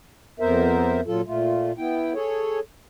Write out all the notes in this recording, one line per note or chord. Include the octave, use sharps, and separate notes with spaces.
F2 B3 A#4 C5 E5
A#2 F#3 F4 A4
A#2 A3 F4
B3 E4 G5
G#4 A4 C#5